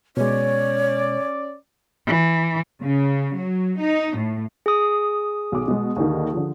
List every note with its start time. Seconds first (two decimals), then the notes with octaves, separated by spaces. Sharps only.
0.17 B2 G#3 C#4 C#5 D5
2.06 E3
2.81 C#3
3.36 F#3
3.78 D#4
4.16 A2
4.66 G#4 D#6
5.52 B1 D6
5.68 B2 G#3
5.96 D#2 D3 D#3
6.33 D3 F3